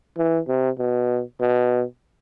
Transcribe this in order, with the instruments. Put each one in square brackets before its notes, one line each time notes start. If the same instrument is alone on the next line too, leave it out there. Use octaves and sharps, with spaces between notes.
[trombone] E3
C3
B2
B2